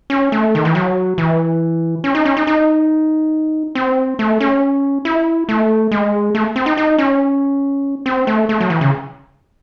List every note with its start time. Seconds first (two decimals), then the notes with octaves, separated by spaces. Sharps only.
0.10 C#4
0.32 A3
0.55 D#3
0.65 E3
0.75 F#3
1.18 E3
2.04 C#4
2.15 D#4
2.25 C#4
2.37 D#4
2.47 D#4
3.75 C4
4.19 A3
4.40 C#4
5.05 E4
5.49 A3
5.91 G#3
6.35 A3
6.56 C4
6.66 D#4
6.77 D#4
6.98 C#4
8.06 C4
8.27 A3
8.49 A3
8.60 F#3
8.70 E3
8.81 C#3